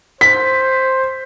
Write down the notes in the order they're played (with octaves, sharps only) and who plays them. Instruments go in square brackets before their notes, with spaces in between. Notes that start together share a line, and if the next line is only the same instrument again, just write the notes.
[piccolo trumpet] C5 [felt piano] B6